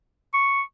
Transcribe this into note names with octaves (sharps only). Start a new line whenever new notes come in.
C#6